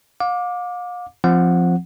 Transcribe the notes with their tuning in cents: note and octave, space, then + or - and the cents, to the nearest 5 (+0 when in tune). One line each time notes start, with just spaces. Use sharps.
F5 +40 D6 +0
F3 +0 C4 +0 F#5 -10